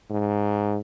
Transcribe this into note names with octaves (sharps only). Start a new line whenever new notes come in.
G#2